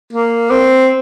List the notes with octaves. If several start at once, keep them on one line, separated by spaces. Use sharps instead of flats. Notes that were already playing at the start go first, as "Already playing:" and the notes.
A#3
C4